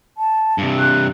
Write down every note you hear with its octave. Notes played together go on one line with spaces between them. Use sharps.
A5
G2 C3
F#6